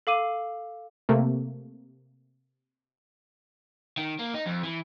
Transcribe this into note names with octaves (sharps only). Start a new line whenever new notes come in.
A4 F5 D6 D#7
C3 A3 A#3
D#3
A#3
D#4
F2
E3